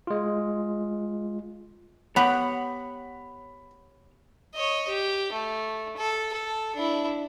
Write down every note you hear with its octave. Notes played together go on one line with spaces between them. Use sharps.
G#3 F4
B3 G4 C#5 F#5 B5
C#5 D#5
G4
A3
A4
A4
D4 E4